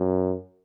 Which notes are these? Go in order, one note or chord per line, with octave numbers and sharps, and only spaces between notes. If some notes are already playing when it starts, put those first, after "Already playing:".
Already playing: F#2